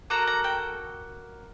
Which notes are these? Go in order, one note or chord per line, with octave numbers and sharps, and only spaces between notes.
A#3 F#4 A4 A#5
A#5
G5